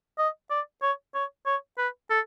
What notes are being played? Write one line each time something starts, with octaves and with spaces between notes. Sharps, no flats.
D#5
D5
C#5
C#5
C#5
B4
A4